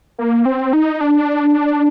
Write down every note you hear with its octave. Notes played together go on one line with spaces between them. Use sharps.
A#3
C4
D#4
D4